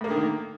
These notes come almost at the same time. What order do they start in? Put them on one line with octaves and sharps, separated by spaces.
A2 A#3 D3 D#3